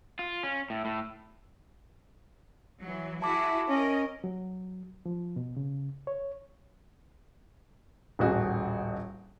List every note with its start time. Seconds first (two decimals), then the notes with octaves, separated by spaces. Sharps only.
0.19 F4
0.43 C#4
0.70 A2
0.85 A2
2.82 E3 F#3
3.22 E4 F#4 G#4 A5 D6
3.68 C#4 A#4 D#5
4.24 F#3
5.06 F3
5.36 B2
5.57 C#3
6.07 C#5
8.19 D#1 A1 F#4 G#4